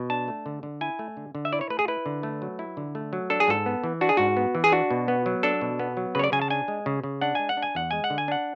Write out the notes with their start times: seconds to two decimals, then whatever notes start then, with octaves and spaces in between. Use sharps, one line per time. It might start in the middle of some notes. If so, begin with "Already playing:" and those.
Already playing: B2
0.10 D4 A5
0.28 A3
0.46 D3
0.63 D3
0.81 E4 G#5
0.99 A3
1.17 D3
1.35 D3
1.45 E5
1.53 E4 D5
1.61 C#5
1.70 A3 B4
1.79 G#4
1.88 E4 B4
2.06 D3
2.23 A3
2.42 F#3
2.59 E4
2.77 D3
2.95 A3
3.13 F#3
3.30 D4 A4
3.40 G#4
3.48 G#2 A4
3.66 B3
3.84 E3
4.01 D4 F#4
4.09 G#4
4.17 G#2 F#4
4.37 B3
4.55 E3
4.64 G#4
4.72 D4 F#4
4.91 B2
5.08 B3
5.26 F#3
5.43 D4 A4
5.61 B2
5.79 B3
5.97 F#3
6.15 C#3 B4 C#5
6.24 D5
6.32 C#3 G#5
6.42 A5
6.50 D4 G#5
6.68 G#3
6.86 C#3
7.04 C#3
7.21 D4 F#5
7.35 G#3 G#5
7.49 F#5
7.57 D4
7.62 G#5
7.75 E2 F#5
7.91 G#3 G#5
8.04 F#5
8.10 D3
8.18 G#5
8.28 D4 F#5